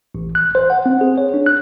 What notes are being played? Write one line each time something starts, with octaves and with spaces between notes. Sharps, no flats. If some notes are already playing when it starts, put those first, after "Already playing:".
A1
F#6
C5
F#5
C4
G#4
C#5
D4
F#6